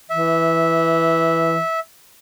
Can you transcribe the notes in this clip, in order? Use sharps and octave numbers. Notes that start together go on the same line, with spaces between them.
E3 E5